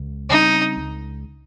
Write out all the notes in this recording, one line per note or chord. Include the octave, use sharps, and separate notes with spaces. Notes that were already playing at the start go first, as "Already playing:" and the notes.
Already playing: C#2
C#3 G3 C4 D#4
C#2